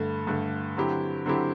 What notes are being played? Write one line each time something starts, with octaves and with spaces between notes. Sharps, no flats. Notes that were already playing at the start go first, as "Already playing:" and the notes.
Already playing: G2 D3 A3
G2 D3 A3
D3 F#3 C4 E4 G4
D3 F#3 C4 E4 G4